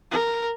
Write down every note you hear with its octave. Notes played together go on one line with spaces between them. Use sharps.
A#4